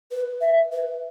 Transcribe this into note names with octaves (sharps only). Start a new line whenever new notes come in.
B4
E5
B4